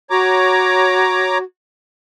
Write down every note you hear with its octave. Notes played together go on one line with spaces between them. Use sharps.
F#4 C#5 A#5 D6